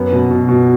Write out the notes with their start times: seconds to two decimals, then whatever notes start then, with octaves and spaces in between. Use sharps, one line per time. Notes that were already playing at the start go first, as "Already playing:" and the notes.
Already playing: F#2 B3
0.12 B2
0.31 B2
0.49 B2